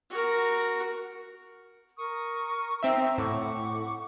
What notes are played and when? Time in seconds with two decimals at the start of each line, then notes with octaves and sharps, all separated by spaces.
0.11 F#4 A#4
1.97 A#4 C#6 D#6
2.83 C4 D#4 E5 A#5
3.18 A2 F#5 C#6 D6